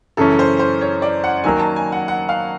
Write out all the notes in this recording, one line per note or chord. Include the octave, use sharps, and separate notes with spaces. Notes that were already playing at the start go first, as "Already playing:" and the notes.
F#2 C#3 E3 A3 C#4 A4
C5
C5
C#5
D5
F#5
D#3 F#3 A#3 G#5
A5
G#5
F#5
F#5
F5